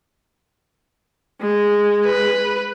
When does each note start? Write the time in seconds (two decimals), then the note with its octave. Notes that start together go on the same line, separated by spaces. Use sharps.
1.41 G#3
2.06 B4